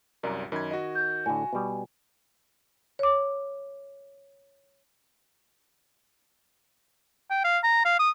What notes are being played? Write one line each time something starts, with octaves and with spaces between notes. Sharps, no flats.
C2 F#2 A#4 D5
F#2 D#3 B5 G#6
F#4 D#5
G6
A2 D3 G#5
B2 G3
C#5 D6
G5
F5
A#5
F5
D#6